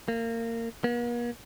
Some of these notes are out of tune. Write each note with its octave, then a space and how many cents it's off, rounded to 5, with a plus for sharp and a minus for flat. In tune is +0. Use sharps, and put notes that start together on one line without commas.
A#3 -25
A#3 +45